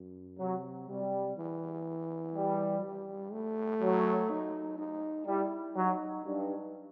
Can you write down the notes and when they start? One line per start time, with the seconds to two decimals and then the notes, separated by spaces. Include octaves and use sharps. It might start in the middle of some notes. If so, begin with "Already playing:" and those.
Already playing: F#2
0.39 C3 F#3
0.88 C3 G3
1.37 E3
2.35 G3
2.83 G3
3.32 A3
3.81 F#3
4.30 D#4
4.78 D#4
5.27 G3 E4
5.76 F#3 D#4
6.24 G2 D#4